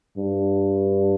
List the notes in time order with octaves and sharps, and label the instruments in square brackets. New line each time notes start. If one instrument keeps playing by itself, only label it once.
[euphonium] G2